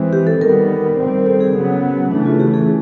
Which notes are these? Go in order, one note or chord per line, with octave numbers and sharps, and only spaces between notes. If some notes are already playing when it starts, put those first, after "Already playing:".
Already playing: E3 G#3 C4
G4
A4
D#3 G3 B3 A#4
D#3 G3 C4
A4
G#4
C#3 F#3 B3
C#3 E3 A3 D4
F4
G4
G#4